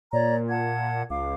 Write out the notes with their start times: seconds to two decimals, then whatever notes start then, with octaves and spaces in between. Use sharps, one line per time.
0.13 A#2 C#5 D5 A#5
0.49 F#5 A5 G#6
1.10 C#2 F5 D6